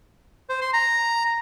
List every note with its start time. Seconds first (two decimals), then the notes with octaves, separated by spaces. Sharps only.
0.49 C5
0.61 C6
0.73 A#5